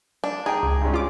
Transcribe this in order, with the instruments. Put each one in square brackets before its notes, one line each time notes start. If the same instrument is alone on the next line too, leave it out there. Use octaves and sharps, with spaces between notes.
[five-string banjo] D4
[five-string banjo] G#4 [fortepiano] G5 A#5
[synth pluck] C#2
[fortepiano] G2 G#3 C#4
[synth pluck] F4 D6